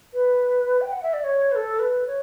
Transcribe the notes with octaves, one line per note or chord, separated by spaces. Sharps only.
B4
G5
F#5
E5
D5
C#5
B4
A4
B4
C#5